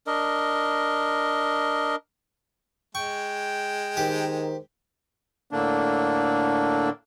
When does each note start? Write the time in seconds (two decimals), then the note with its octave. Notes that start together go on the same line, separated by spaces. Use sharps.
0.07 D4 A#4 D#5
2.95 G#3 G5 C#6
3.97 D#3 G4 A#4 C5
5.51 A2 D3 A#3 D4